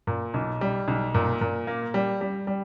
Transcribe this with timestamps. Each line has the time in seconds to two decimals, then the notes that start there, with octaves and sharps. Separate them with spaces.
0.07 A#2
0.34 B1
0.61 G3
0.88 B1
1.15 A#2
1.41 A#2
1.67 A#3
1.94 G3
2.21 G3
2.47 G3